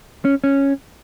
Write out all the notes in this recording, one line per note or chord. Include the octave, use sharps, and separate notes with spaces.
C#4
C#4